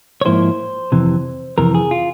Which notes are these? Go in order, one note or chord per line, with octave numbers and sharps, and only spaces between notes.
C#5
G#2 F3 A#3 E4 C5
F2 C3 E3
F2 C3 E3 A#4
G#4
F4